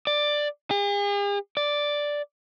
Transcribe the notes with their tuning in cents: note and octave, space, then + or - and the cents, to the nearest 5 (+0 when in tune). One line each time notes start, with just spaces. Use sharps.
D5 +10
G#4 -45
D5 +0